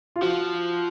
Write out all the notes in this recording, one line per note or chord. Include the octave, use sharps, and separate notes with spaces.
F4
F3 F#4